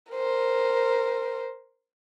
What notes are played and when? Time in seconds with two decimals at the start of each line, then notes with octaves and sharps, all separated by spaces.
0.13 A#4 C5